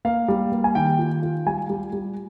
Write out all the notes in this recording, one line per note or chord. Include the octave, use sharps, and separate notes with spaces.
A#3 F5
G3
A#3
G#5
D#3 G5
F4
F4
G3 G#5
G3
G3